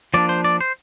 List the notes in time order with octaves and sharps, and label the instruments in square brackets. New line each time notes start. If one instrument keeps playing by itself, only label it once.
[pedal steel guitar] F3 A#3 D4 D5
C5
D5
C5